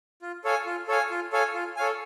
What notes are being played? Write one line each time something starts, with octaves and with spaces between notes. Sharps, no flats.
F4
A4 C#5 F5 G#5
F4
A4 C#5 F5 G#5
F4
A4 C#5 F5 G#5
F4
A4 C#5 F5 G#5